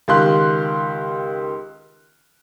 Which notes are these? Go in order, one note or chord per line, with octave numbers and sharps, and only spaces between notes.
C#2 D#3 G4 F5 C6 F#6